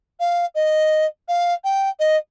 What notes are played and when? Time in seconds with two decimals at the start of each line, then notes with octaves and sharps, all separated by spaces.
0.20 F5
0.55 D#5
1.28 F5
1.64 G5
2.00 D#5